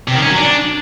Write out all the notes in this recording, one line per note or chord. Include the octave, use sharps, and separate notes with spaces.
C3
D#3
C#4
F#3
D4